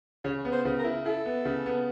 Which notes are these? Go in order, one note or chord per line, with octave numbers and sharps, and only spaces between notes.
C#3 C#5
B3
C5
C#3
A#4
E4
E4 A4
B3
C#3
B3